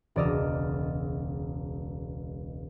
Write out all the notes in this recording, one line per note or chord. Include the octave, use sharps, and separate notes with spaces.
E1 C#2 D5 D#5 E6 F6